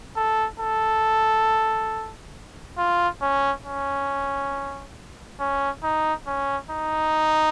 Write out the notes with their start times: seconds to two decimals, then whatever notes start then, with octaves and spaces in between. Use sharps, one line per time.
0.17 A4
0.60 A4
2.78 F4
3.22 C#4
3.66 C#4
5.40 C#4
5.83 D#4
6.27 C#4
6.71 D#4